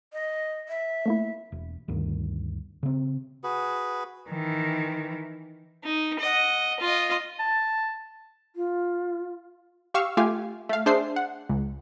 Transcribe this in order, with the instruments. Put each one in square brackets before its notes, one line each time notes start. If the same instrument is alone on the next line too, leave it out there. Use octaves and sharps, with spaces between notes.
[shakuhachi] D#5
E5
[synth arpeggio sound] A3 A#3 E4
[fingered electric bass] E1
D2 G2 D#3
C#3 C4
[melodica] F#4 G#4 B4
[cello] D#3 E3
[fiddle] D#4
D#5 F#5
F4 D#5
[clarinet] A5
[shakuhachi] F4
[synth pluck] G4 F5 C#6 E6 F6
A3 F4 G4 F5 G#5
A3 F5
D4 G#4 C5 E5 C7
F#5
C#2